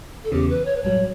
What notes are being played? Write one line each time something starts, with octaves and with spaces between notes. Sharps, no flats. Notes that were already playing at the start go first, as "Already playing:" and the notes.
A4
E2 C#3 E3 G4
B4
C#5
B4
A1 G2 F#3 C#5